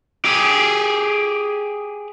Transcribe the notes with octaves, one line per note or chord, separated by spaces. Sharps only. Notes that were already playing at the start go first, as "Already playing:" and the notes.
G4 G#4